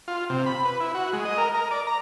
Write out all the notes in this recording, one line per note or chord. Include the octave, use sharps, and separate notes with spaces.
F4
C3
B5
B4
E4
F#4
G#3
D#5
A#4
A#4
D5
A#5